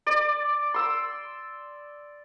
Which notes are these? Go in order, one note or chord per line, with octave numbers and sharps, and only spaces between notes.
D5
C6 E6